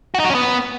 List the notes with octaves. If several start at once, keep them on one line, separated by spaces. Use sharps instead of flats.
F#4
D#4
F#3
C#4
B3